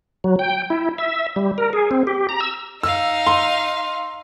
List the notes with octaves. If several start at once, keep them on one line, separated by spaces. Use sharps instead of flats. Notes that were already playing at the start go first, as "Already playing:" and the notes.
F#3
G5
E4
E5
G3
A#4
G#4
C4
G4
A#5
E6
D#4 F5 E6
C6